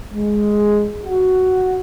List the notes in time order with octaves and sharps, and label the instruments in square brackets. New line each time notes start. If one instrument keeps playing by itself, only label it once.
[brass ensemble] G#3
F#4